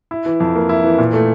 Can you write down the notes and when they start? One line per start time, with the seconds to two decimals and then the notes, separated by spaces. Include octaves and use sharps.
0.11 E4
0.26 E3
0.40 F2
0.55 A#3
0.69 E4
0.84 E3
0.98 A#2
1.13 A3